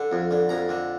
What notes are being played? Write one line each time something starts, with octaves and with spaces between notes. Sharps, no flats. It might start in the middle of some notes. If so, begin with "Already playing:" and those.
Already playing: D3
F2
D3
F2 A#5
D3